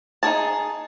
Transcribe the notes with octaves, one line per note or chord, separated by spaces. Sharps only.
D#4 E4 G#4 A5